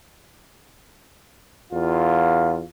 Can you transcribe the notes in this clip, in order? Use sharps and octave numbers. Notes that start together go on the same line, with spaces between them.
E2 F4